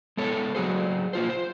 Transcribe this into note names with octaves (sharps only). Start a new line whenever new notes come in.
G#3 B3 A4 C#5
F#3 F#4 G#4 C5
A#3 F4 C5
C5